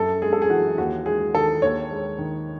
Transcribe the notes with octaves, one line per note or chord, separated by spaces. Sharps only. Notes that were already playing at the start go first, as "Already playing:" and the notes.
Already playing: F#2 A4
G#3 G#4
A4
G#4
E3 F#4
D#2 F#4
G#3 G#4
D#3 A4
D#2 C#5
G#3
D#3